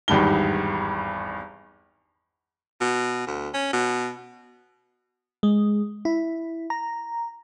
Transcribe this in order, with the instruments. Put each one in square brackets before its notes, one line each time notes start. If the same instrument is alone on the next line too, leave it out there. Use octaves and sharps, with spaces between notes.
[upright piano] G#1 E2 G2 D#3 G7
[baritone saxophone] B2
D2
C#4
B2
[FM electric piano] G#3
E4
A#5